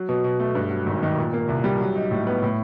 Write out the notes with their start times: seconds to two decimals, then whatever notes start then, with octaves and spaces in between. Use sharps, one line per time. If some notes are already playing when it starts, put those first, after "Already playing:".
Already playing: F#3
0.09 B2
0.24 B2
0.40 A3
0.55 G2
0.70 F#3
0.86 G#1
1.03 D#3
1.17 A#2
1.33 A#3
1.48 C2
1.64 G3
1.80 F#3
1.95 D#4
2.11 A2
2.27 B3
2.43 A2